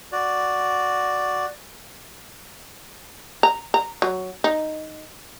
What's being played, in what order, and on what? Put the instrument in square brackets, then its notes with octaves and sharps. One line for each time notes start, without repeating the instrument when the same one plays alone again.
[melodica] F#4 D5
[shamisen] A#5
A#5
F#3
D#4